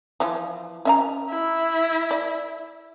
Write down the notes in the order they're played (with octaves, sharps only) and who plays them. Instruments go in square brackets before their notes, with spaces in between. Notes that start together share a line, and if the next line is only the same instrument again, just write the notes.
[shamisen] E3 F3
C#4 E5 A#5
[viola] E4
[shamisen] D5